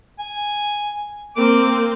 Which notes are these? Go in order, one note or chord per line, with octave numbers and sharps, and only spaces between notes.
G#5
A#3 C4 D6